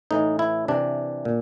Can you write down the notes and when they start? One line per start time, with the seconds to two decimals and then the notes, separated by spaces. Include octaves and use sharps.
0.11 A2 E3 D#4
0.39 E4
0.68 C3 E3 D4
1.25 A#2